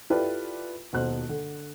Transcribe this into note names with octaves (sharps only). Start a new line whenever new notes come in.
E4 F4 G4 A4 B4 D5
D#1 B2 C5 F#6
D3